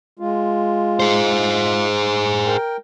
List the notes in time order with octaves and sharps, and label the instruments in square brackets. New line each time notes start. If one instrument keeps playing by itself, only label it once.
[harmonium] G#3 F4
[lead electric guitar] G#4 C5
[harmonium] A#4 G5